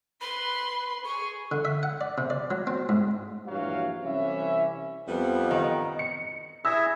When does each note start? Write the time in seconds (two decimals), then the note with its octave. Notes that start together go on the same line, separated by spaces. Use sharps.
0.21 B4 B5 C6
1.05 G#4 C#6
1.52 D3
1.65 E5
1.83 F#5
2.01 D5
2.18 C3
2.30 D5
2.51 F#3
2.67 C4
2.89 G#2
3.47 A#1 G2 E3 F#3 F5
4.02 C2 E3 C#4 E5
5.08 F2 G3 B3
5.51 D#3 D#5
5.99 C#7
6.65 E4 G#4 E5 E6 A#6